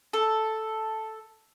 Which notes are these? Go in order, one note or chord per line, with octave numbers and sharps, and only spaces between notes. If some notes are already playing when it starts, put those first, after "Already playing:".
A4